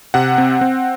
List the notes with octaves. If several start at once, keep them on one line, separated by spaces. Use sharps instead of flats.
C3 F#5
C4
C4